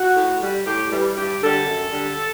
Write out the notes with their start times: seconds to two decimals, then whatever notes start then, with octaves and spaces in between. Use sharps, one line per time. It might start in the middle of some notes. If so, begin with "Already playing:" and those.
Already playing: F#4
0.16 A2
0.41 G3
0.66 A2 G4
0.91 E3 G3
1.17 G2 G4
1.42 D3 G3 A4
1.66 F#2
1.92 D3 G3